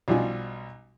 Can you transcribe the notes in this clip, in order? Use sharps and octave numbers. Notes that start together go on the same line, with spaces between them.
B1 F3 G3 D#4 F4 G#5